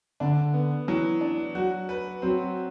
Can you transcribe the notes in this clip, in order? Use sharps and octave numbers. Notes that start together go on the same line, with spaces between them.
D3 D4
B3
E3 F#3
D4
F#3 F#4
B4
F#3 C4